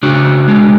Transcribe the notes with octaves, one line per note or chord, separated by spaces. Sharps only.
C#3 D4 F#4
G#3 D4